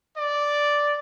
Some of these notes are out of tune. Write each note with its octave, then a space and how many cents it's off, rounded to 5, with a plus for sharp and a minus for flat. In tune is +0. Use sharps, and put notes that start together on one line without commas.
D5 -5